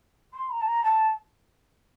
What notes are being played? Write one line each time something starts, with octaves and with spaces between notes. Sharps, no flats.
C6
A#5
A5
A#5
A5